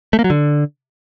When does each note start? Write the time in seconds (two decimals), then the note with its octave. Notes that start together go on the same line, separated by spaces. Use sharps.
0.13 A3
0.19 A#3
0.24 F#3
0.30 D3